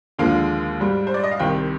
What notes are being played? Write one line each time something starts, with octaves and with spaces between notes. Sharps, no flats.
D#2 D3 F3 G#3 F5
G#2 G3
C5
D5
D#5
F5
C2 C3 D#3 G5